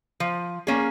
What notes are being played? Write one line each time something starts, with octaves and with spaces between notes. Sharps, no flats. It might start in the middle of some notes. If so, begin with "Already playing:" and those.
F3
A#3 C#4 G#4